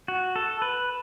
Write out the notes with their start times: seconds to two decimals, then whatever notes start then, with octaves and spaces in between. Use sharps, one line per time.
0.08 F#4
0.36 A4
0.62 B4